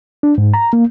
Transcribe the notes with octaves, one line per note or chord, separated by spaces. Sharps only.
D4
G#2
A#5
A#3